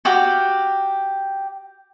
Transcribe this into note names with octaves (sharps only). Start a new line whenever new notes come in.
F#4 G4 F5